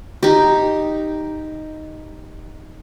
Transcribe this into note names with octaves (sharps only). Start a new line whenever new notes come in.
D#4 G4